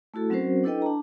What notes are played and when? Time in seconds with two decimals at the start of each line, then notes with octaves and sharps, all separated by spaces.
0.14 A3 E4 F#4 A4
0.30 F#3 C4 C#4 F#4 A#4 C5
0.64 D4 E4 A4 B4 D#5 G5
0.82 D4 A5 A#5